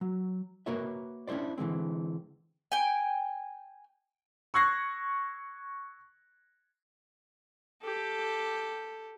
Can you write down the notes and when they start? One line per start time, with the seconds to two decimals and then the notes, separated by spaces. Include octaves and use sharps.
0.01 F#3
0.66 A#3 F#4 A#4 B4 C#5 E5
1.27 C#4 D4 E4 C5 D5
1.58 D3 E3 G#3 C4
2.72 G5 G#5
4.54 C#6 E6 F#6 G#6 A#6 C7
7.83 G4 A4